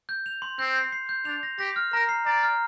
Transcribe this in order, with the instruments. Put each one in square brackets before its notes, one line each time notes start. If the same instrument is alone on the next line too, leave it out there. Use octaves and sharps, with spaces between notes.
[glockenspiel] G6
F7
C6
[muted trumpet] C4 [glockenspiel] G6
[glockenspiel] C7
C7
G6
[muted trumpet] D4 [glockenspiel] F7
[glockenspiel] A#6
[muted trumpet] G4 [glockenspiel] A#6
[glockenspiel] F6
[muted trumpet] A#4 [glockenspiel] A#5
[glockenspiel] C7
[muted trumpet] D5 [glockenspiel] A#5
[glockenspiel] F6